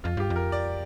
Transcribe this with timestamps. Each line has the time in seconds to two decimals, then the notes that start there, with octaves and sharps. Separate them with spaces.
0.04 F2 F4
0.17 G2 G4
0.30 F2
0.36 A#4
0.52 D5